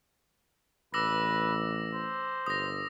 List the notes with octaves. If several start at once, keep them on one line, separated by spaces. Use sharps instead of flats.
A1 B4 D6 E6 A#6
C5
G1 D#6 A#6